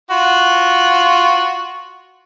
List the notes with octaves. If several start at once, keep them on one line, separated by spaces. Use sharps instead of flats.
F4 F#4